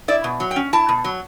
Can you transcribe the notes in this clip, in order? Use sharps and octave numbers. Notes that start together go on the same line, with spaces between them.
E4 D5
B2
F#3
G5
C#4
E4 A5
B2
F#3